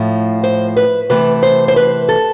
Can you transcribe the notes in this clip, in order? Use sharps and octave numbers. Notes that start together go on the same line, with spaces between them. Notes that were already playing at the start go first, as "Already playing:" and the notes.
Already playing: A2 F3 A3
C5
B4
C3 E3 A3 B4
C5
C5
B4
A4